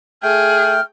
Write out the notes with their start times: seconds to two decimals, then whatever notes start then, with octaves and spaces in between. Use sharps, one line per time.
0.23 A3 G#4 G5 F6